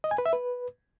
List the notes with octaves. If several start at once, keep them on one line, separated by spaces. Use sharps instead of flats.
D#5
G#5
B4
E5
B4